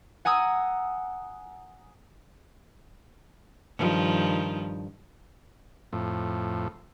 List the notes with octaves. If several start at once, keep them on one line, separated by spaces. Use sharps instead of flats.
F#5 G#5 A#5 D#6 E6
G2 D#3 F3
F2 A2